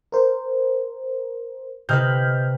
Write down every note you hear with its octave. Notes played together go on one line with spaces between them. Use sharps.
A#4 C5
C3 B4 D#5 F6 G6